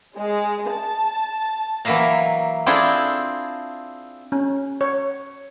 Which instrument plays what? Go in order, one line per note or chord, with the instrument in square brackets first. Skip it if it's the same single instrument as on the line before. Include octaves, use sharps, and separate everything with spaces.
[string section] G#3
A5
[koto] E3 F#3 A#3 E5 F5 A#5
C4 D4 E4 F4 G#4 A4
[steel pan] C#4
C#5